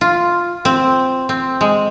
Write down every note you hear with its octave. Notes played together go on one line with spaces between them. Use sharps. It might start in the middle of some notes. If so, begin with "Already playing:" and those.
F4
C4
C4
G#3